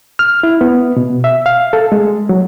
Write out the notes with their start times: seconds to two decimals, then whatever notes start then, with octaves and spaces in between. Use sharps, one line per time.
0.19 F6
0.43 E4
0.61 B3
0.96 B2
1.24 E5
1.46 F5
1.73 A4
1.92 G#3
2.29 F#3